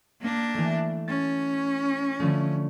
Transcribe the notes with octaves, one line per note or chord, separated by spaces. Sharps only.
A#3 D4
E3 A3
C#4 A6
D3 F3 A3